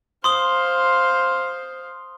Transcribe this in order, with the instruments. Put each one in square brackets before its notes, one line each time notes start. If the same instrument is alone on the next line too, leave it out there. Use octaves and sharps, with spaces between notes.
[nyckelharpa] C5 F5 [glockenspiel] C6 D#6 G7